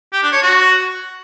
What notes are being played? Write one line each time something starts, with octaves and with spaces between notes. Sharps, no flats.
G4
D4
C#5
F#4